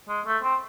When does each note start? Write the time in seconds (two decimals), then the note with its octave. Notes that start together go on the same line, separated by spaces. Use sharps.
0.09 G#3
0.26 A3
0.43 C4